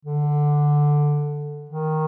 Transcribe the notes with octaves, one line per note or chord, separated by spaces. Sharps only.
D3
D#3